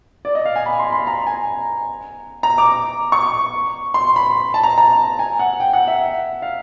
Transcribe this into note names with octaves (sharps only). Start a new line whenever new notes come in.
D5
D#5
F5
G#5
B5
C6
B5
A#5
G#5
A#5
D6
C#6
C6
B5
A5
A#5
A#5
G#5
F#5
G5
F#5
E5
F5